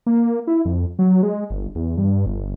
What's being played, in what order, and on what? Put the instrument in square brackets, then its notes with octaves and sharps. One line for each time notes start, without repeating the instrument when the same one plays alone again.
[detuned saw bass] A#3
E4
F2
F#3
G#3
G1
E2
G2
G1